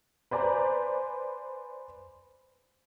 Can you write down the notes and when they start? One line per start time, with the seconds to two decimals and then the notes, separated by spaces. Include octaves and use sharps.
0.31 B4 C5 D5 G#5 A#5